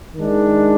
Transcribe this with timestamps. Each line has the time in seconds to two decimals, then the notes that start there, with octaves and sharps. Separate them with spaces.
0.14 D#3 G#3 D4